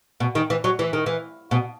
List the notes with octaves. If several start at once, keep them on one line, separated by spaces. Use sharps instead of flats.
B2
D#3
E3
F#3
E3
D#3
E3
B2